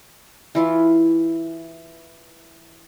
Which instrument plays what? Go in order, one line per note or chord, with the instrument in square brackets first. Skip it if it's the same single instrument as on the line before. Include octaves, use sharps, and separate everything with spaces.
[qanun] E3 E4 F4